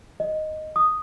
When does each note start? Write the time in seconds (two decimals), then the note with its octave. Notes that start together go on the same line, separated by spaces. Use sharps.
0.20 D#5
0.76 D#6